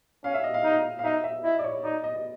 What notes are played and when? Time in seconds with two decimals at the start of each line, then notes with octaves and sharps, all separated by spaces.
0.24 C#4 F5
0.34 E5
0.44 D#5
0.54 F5
0.64 D#4
0.99 F5
1.04 D#4 E5
1.24 E5
1.44 E4 D#5
1.59 D5
1.64 C#5
1.84 D#4 D5
2.04 D#5
2.16 D#5